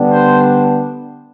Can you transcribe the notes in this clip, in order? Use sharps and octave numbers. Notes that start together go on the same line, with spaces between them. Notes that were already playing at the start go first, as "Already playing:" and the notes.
Already playing: D3 G3 B3 D4
C5